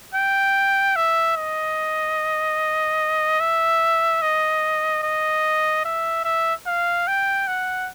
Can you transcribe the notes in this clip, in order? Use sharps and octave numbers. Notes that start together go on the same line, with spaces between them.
G5
E5
D#5
E5
D#5
D#5
E5
E5
F5
G5
F#5